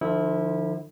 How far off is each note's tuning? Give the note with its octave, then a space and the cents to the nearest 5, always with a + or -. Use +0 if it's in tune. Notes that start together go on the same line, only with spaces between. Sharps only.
D3 +40 F3 +0 E4 -20